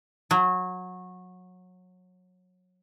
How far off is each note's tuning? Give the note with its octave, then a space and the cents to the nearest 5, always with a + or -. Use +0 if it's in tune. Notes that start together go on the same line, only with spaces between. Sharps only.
F#3 -20